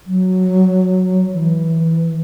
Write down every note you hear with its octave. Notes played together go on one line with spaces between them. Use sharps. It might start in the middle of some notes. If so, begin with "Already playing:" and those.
F#3
E3